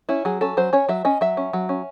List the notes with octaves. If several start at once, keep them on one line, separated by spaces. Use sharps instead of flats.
C#4 E4
F#3 G#4
C#4 A4
F#3 C5
C#4 C#5
F#3 E5
C#4 D#5
F#3 E5
C#4
F#3
C#4